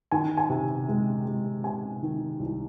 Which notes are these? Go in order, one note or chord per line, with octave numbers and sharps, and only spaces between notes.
D#3 G#5
G#5
C3
G#3
G#3
C3 G#5
D#3
C2